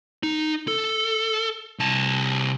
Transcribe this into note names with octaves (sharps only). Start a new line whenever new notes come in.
D#4
A4
C2 A5